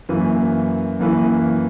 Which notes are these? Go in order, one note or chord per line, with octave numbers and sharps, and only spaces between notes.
F#2 E3 A#3 E4 B4
F#2 E3 A#3 E4 B4